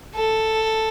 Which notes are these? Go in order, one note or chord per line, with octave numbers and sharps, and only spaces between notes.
A4